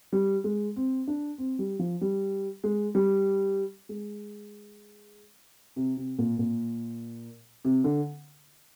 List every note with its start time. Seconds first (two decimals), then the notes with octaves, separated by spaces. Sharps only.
0.13 G3
0.44 G#3
0.76 C4
1.08 D4
1.38 C4
1.59 G3
1.79 F3
2.01 G3
2.64 G#3
2.95 G3
3.89 G#3
5.76 C3
5.97 C3
6.19 A#2
6.39 A#2
7.65 C3
7.84 D3